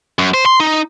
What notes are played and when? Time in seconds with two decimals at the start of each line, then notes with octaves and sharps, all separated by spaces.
0.19 F#2
0.34 C5
0.46 C6
0.60 D#4